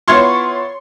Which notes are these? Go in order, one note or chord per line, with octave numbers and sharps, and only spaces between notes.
B3 E4 F4 C#5 C6 C#6